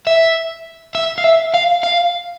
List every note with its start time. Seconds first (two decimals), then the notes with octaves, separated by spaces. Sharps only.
0.07 E5
0.95 E5
1.18 F5
1.24 E5
1.54 F5
1.83 F5